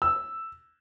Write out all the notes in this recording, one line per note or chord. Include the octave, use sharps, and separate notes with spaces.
E6